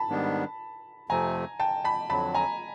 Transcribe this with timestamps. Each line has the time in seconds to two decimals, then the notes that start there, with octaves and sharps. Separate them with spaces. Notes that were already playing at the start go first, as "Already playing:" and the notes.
Already playing: A5 B5
0.09 G#2 D#3 G3 B3 D4
1.09 F2 C3 F3 A3 C4 G#5 A#5
1.60 G5 A5
1.84 A5 B5
2.10 F2 D3 F#3 A5 B5
2.35 G#5 A#5